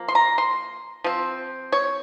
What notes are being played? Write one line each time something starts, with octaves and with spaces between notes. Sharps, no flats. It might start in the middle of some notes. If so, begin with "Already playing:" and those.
Already playing: F3 A#3
C6
A#5
C6
F3 C4
C#5